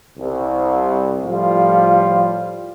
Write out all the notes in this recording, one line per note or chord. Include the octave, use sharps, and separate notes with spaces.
C2
A2 F3 G3 F4